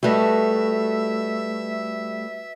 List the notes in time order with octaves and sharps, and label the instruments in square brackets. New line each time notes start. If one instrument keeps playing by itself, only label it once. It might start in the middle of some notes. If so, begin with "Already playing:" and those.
[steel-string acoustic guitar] G3 A3 [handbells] F#4 B4 D#5 [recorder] E5